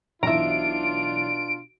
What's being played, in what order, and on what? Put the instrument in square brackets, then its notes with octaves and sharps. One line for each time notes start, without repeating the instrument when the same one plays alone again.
[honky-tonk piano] B1 E3 [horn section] B2 D4 F4 [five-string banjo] E5 A#5 [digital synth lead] D7